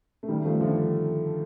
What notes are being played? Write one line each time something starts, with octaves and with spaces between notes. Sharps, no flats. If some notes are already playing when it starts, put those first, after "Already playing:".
A3
D#3 G3
F3 A3
D3 F3